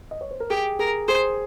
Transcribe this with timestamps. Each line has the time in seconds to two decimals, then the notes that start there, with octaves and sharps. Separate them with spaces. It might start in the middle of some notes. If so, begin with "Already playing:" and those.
0.11 D#5
0.21 C#5
0.31 C5
0.40 A#4
0.50 G4 G#4
0.79 G#4 A#4
1.08 G#4 C5